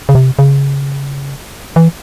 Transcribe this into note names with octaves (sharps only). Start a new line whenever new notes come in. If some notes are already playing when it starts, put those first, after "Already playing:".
C#3
C3
C#3
E3